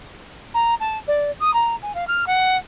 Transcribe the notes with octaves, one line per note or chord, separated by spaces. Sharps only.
A#5
A5
D5
D#6
A#5
G#5
F5
F6
F#5